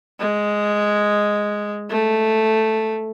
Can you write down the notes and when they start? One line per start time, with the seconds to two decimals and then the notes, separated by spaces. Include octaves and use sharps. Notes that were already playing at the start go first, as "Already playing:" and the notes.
0.19 G#3
1.90 A3